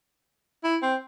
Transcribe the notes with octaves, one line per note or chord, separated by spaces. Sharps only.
E4
C4